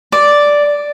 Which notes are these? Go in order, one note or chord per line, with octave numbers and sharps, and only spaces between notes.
D5